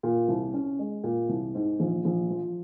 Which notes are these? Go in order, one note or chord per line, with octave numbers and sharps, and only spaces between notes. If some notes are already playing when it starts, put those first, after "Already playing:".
A#2
C2
C#4
G#3
A#2
C2
G#2
A#1
A#1
F3